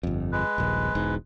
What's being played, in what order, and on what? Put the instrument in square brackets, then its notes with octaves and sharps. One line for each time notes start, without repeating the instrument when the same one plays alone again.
[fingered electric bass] G1 F2
[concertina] G#3 B4
[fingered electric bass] D#1 A#1
E1 G#2